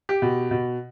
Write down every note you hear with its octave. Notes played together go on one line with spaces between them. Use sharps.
G4
B2
B2